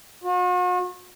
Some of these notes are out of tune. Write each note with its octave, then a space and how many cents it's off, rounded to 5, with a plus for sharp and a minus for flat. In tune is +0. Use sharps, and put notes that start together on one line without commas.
F#4 -45